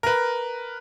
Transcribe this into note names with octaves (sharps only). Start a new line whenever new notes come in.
A#4 B4